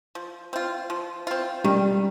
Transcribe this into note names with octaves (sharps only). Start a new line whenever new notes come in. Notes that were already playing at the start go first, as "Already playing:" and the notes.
F3
C4 F4
F3
C4 F4
D#3 G3